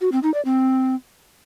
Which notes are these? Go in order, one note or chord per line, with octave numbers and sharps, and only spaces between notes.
F#4
C4
D#4
D5
C4